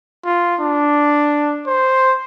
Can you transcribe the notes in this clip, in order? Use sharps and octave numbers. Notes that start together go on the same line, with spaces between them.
F4
D4
C5